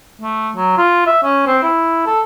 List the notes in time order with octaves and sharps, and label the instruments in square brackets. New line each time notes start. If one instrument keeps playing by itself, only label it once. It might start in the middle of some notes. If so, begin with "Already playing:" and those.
[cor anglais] A3
F#3
F4
E5
C#4
C4
E4
A4